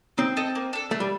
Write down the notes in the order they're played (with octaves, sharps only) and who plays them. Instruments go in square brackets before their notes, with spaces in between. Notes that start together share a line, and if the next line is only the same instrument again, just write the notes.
[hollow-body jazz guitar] C4 [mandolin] D#4
[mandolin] A4 D#5
A#3
D4 A4
[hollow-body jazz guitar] A3 [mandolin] D4
[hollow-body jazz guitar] G3